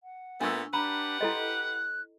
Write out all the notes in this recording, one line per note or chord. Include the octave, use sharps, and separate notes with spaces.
F#5
A#2 A3 B3 D4 C#6 E6
D4 G4 B4 F#5 A#5 B5
E4 A4 D#5 C6
F#6